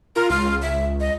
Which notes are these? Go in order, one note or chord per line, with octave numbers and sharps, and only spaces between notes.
F4 A#4
C#2 F4
E5
D#5